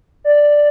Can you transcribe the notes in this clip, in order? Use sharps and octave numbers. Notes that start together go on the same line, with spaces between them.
D5